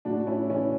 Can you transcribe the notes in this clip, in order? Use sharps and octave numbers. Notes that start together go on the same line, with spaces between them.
A2 D4 F#4
C#4 E4
E3 C#4